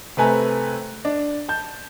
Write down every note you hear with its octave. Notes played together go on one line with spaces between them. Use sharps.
C3 A3 B4 G#5 A#5
D4
A5 G6